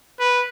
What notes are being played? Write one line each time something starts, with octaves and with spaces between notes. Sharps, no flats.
B4